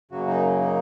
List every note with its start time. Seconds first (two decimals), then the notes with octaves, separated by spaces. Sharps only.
0.11 F#2 C#3 F#3 A#3 F#4
0.27 D#4
0.61 D#4